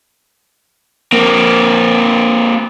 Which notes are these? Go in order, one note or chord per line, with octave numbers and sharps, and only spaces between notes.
A#3 C4